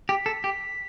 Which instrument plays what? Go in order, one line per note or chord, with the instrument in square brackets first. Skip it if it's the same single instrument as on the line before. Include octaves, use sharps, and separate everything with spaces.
[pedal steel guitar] G4 [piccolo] B6
[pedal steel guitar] A4
G4